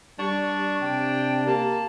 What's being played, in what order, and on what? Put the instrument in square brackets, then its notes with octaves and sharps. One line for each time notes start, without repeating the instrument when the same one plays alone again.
[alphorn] G3 [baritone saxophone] D4 [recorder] C#6
[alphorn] C3 [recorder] G5
[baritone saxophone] A#3 [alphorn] G4 [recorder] A5